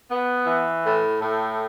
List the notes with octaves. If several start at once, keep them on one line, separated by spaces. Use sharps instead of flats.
B3
E3
A2
A2